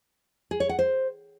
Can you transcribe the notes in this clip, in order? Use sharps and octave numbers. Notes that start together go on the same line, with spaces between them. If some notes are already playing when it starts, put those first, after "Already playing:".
G#4
C#5
F#5
C5